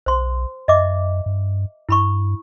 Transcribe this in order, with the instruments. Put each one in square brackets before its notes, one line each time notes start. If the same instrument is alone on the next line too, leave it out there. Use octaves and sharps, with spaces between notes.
[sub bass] B1 [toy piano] C5 C6
[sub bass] F#2 [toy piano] D#5 E5 D6
[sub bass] G2
[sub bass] G2 [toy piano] E4 B5 C#6